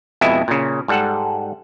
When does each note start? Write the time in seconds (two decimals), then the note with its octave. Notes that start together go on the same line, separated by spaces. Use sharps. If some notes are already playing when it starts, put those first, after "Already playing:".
0.21 F2 B2 G#3 E4 E5
0.48 A#2 C#3
0.88 G#2 G3 A4 F#5